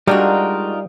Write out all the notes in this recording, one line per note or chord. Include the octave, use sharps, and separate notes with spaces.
G3 G#3 D4 D#4 F4 F#4 A#4